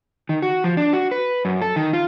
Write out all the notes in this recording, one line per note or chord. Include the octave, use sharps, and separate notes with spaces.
D#3
F#4
F3
D4
F#4
B4
F#2
A4
D#3
F4